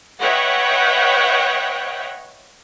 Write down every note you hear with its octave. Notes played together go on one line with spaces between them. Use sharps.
B4 C#5 D#5 E5 F#5 G5